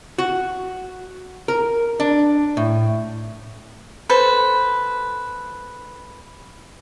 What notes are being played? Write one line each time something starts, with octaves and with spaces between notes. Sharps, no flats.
F#4
A#4
D4
A2
A4 B4 C5